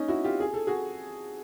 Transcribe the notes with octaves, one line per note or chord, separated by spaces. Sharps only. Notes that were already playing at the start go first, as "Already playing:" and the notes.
Already playing: A#3 C#4 D#4
E4 F#4
F4 G4
G#4
A4
F#4 G#4